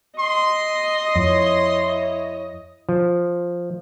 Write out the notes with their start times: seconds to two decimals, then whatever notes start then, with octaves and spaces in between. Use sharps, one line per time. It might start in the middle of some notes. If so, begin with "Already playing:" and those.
0.18 D#5 C6
1.16 F2 E4 C#5
2.89 F3